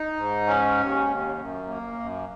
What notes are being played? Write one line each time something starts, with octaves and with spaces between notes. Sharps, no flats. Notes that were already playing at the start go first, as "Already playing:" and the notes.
Already playing: D#4
G#2
C#4
D#2
D#2
F#2
A#3
F#2